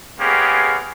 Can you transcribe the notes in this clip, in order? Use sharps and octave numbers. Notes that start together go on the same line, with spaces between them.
G#3 A#3 B3 C#4 G4 G#4